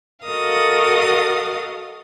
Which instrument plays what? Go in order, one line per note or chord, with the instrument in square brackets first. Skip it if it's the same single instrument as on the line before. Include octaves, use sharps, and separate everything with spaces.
[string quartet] F#4 A4 A#4 D#5 F5 D#6